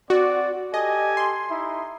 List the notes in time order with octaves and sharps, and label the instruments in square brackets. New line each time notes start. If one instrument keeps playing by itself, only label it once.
[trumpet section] C4 D5 [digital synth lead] F#4
[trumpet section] G4 A4 G#5 [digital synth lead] D#5
[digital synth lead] C6
[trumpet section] D#4 E4 E5